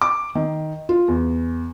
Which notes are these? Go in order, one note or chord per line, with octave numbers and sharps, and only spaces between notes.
D6
D#3
F4
E2